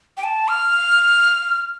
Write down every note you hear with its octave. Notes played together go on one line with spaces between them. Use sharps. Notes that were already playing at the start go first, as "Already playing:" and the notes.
G5
A5
F6